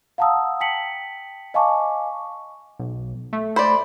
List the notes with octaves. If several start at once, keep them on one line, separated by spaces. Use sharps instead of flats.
F5 F#5 A5 A#5 D#6 E6
G5 A5 B6 C#7 F#7
D#5 F5 G#5 A5 C#6 D6
B1
A3
C5 D5 B5